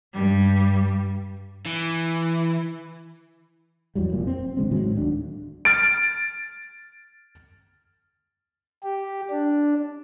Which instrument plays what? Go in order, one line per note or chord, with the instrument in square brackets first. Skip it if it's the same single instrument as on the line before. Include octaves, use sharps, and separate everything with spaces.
[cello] G2 G3
[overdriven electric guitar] E3
[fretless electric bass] F2 E3 F#3 G3
F1 A#2
C4
G#1 D3 G#3 C4
A2 D#3 F#3 G#3
D1 D2 D4
[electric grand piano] F6 A6 D7
[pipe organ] G4
D4